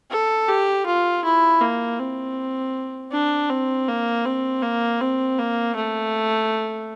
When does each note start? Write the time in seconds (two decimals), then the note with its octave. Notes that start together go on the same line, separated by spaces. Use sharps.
0.11 A4
0.48 G4
0.86 F4
1.24 E4
1.61 A#3
1.99 C4
3.12 D4
3.49 C4
3.88 A#3
4.25 C4
4.63 A#3
5.01 C4
5.38 A#3
5.76 A3